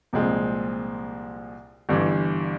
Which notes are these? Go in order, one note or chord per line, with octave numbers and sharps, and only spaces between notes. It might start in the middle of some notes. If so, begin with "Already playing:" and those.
C2 A#2 F3 G#3 C4
G1 G2 E3